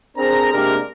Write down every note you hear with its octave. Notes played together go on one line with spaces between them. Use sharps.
C4 D4 G#4 A#4 C5 A#5
C3 G#3 A#3 D4 G4 A#4